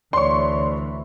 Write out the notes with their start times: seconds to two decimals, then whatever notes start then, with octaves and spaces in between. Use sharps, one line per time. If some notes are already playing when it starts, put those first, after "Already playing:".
0.13 D2 E3 C#5 D5 C6 C#6